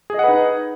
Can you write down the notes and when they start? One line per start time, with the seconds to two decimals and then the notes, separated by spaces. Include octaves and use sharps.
0.10 G#4
0.14 D#5
0.19 F#5
0.24 B4
0.28 D#4